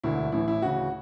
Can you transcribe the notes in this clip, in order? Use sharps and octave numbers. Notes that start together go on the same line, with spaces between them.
E1 D2 D3 E4
A1 A2 E3 E4
E4
D2 C#3 E3 F#4